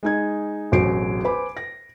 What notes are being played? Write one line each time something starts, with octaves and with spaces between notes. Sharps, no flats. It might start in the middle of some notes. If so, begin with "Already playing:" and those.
G#3 D#4 G#6
E1 A1 F#3 C5 C7 D7
B4 C5 G#5 B5 D6
A#6